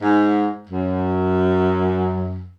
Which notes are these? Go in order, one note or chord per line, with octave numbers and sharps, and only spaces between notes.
G#2
F#2